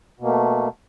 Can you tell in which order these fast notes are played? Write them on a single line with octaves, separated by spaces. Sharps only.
B2 A#3 A3